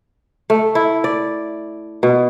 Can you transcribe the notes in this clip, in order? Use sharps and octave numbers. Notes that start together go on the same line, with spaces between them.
A3
E4
D5
B2